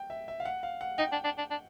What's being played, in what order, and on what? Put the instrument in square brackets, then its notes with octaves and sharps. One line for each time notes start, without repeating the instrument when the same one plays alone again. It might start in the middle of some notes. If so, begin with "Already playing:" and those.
Already playing: [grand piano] G5
E5
E5
F5
F#5
F5
F#5
[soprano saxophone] D#4 [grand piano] G5
[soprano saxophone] D4
D4
D4
D4